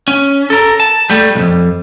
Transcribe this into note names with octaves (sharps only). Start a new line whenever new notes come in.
C#4
A4 A#4
A5
G3 A3
B1 F2